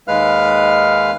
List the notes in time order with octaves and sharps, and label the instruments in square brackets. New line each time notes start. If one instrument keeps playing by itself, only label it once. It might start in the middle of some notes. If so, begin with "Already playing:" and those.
[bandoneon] D#2 G#3 B4 F5 F6